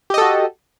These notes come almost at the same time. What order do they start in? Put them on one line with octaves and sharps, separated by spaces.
G4 D#5 A4 F#4